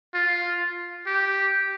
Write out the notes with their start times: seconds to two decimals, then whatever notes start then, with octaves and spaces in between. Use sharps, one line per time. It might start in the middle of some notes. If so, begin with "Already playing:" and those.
0.14 F4
1.06 G4